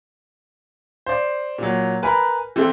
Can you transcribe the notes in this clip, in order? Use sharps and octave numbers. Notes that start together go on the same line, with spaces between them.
C5 D5
A#2 F#3
A#4 B4 G#5 A#5 B5
E3 C4 E4 A4